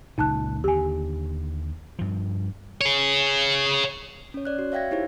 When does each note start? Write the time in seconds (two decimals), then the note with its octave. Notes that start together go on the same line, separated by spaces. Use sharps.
0.18 C#2 A#2 D#4 A5 F#6
0.64 D#2 D3 G4 G#5
1.99 G2 F3
2.81 G#4 C#5
4.34 C#4 C#5
4.45 C#5 D5 F#6
4.59 F#4
4.72 C#5 E5 F5 G5 G#6 A#6
4.91 D#4 E4 G4 C5 C#5